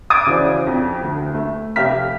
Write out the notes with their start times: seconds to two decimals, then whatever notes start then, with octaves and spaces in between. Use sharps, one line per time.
0.10 D6 D#6 G#6 A6 D7
0.26 C#3 E3 F#4 C5 D5
0.67 F2
1.03 D2
1.34 A3
1.76 F1 G4 E5 F5 F6 B6